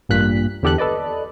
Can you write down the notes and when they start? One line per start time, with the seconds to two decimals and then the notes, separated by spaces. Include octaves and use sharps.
0.09 A1 G2 A#2 F#6 B6
0.63 E2 D3 G4 A4 F#6
0.78 A4 B4 D5 D#5